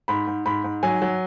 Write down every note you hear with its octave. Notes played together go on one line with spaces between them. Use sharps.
G#2 B5
G#2
G#2 B5
G#2
F#3 G#5
F#3